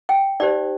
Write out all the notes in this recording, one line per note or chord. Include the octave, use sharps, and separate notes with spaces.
G5
D#4 G4 C5 D5